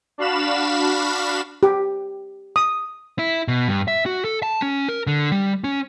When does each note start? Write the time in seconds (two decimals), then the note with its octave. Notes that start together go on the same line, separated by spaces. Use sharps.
0.18 D4 F#4 F5 B5 E7
1.63 G4
2.56 D#6
3.19 E4
3.48 B2
3.68 G2
3.88 E5
4.06 F#4
4.25 A4
4.43 A5
4.62 C#4
4.88 A#4
5.07 D3
5.32 G3
5.64 C#4